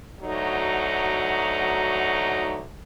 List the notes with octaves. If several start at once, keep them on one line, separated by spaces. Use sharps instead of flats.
D2 F#3 D#4 F#4